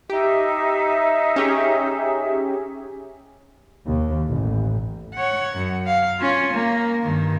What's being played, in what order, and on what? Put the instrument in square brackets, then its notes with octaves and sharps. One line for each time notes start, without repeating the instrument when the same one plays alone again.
[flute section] D#4 E5 [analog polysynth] G4
[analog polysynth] C#4 G4 G#4
[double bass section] D#2
A1
[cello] C#5 F#5
F#2
F5
C#4 F4
A#3
G2 D#3